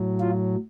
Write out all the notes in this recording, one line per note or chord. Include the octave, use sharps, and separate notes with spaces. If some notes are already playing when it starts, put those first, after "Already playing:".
Already playing: A2 F#3
F4